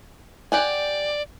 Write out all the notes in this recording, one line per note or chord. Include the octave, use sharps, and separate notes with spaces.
G4 D5 F#5 G#5